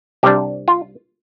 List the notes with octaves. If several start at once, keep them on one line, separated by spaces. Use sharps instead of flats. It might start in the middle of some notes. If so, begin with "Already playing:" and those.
C2 C3 G3 D4 G4
F4